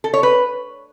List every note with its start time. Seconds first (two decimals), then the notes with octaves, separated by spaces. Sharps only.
0.04 A4
0.14 C#5
0.23 B4